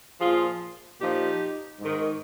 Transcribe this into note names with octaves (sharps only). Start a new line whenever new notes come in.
A#2 F3 F4 G#4
A#2 F3 D#4 G4
G#2 D#3